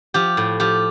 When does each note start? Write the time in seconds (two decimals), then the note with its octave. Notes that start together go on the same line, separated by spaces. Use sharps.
0.14 F3 G4
0.37 A2
0.60 F3 G4